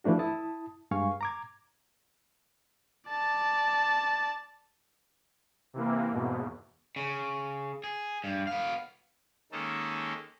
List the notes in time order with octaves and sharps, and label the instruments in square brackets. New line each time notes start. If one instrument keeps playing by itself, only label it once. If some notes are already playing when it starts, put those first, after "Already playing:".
[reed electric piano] E3 F3 A3 D4 F#4
E4 A5 D#6
G2 G#3 F5 G#5 C#6
A#5 D6 G#6
[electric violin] D5 A5
[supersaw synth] C3 E3 A#3
E2 G#2 B2
[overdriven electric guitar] C#3
G#4
G2
B3 F5
[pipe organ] D#3 G#3 A#3 C#4 D#4 A4